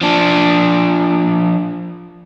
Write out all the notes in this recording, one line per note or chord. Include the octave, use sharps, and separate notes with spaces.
F3 D4